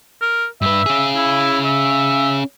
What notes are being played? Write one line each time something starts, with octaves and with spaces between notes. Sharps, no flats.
A#4
G2 B4 E5
C#4 G#4
E4
E5